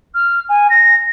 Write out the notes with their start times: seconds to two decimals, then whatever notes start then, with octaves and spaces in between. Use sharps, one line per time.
0.15 F6
0.49 G#5
0.70 A#6